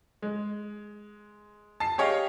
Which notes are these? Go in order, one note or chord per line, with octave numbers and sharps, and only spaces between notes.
G#3
A5 C7
G4 G#4 C#5 D#5 F5